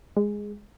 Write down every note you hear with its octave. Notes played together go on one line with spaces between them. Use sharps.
G#3